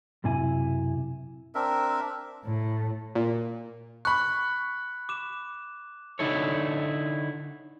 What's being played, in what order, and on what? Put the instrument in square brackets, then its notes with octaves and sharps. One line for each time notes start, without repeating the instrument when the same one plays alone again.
[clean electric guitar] B1 F#2 C3 E4 G#5
[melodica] C4 D4 A#4 E5
[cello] A2
[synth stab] A#2
[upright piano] B5 C#6 [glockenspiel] F#6
[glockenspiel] D6 E7
[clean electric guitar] D3 D#4 E4 A4 C#5